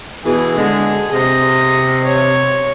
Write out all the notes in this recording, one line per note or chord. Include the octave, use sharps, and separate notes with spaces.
B2 E3 G#4
D3 G#3
C3 D#5
C#5